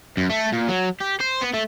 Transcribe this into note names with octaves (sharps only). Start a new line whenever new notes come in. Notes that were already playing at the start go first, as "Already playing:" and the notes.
F#2
A3
A#2
F#3
G4
C5
B3
A3